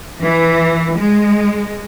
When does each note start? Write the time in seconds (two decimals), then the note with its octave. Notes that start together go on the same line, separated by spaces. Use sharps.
0.22 E3
0.97 G#3